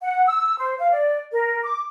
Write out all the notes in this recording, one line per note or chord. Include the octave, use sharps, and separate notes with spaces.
F#5
E6
C5
F5
D5
A#4
D6